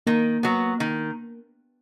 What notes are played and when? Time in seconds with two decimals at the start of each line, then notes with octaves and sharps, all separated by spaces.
0.07 D#3 A#3
0.43 F#3 B3
0.80 D#3